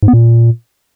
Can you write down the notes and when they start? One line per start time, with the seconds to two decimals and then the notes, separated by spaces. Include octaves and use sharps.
0.03 G#2
0.08 B3
0.13 A#2